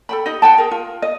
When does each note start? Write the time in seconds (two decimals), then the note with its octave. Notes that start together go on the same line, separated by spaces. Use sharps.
0.09 A4 G5 B5
0.26 D#4 G4 D#5
0.42 F#5 G5 A5
0.58 G#4 A#4
0.71 F4
1.02 D#5